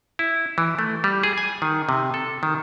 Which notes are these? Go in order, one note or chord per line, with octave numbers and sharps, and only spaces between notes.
E4
E3
A3
G3
G#4
G#5
D#3
C3
A4
D#3